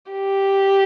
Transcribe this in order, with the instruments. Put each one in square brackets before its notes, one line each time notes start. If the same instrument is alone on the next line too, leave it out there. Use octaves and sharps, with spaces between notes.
[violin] G4